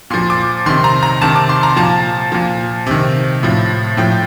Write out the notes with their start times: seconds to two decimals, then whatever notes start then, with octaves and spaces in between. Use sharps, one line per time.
0.10 A#2 F3 C6
0.30 D6
0.66 C3 D#3 C6
0.84 A#5
1.03 A#5
1.21 C3 D#3 A5
1.36 D6
1.49 C6
1.63 A#5
1.76 A#2 F3 A5
2.32 A#2 F3
2.87 C3 D#3
3.43 A2 F3
3.97 A2 F3 G5